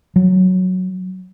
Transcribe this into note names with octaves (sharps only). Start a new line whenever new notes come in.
F#3